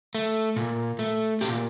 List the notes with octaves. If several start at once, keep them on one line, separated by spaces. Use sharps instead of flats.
A3
A#2
A3
A#2 G4